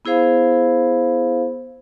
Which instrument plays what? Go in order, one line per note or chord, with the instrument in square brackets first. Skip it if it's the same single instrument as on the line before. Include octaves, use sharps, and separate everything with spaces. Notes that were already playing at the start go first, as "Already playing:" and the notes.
[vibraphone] B3 E4 G#4 C5 F5 B5